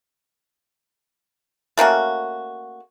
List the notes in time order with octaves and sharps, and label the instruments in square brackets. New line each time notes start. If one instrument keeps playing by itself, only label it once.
[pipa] A3 A#3 C#4 F#4